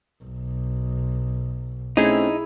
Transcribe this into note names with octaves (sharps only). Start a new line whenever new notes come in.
B1
A3 C4 C#4 D#4 E4 G#4